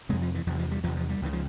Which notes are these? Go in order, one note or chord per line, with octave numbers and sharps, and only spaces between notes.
F2 C3 G#3
F3
E3
E2 C3 F3
F3
G3
E2 C3 F3
F3
G3
C#2 C#3 E3
F3